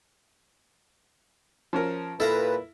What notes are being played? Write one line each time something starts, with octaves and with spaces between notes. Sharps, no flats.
F3 C#4 A#4
A#2 E4 A4 B4 F5 A#5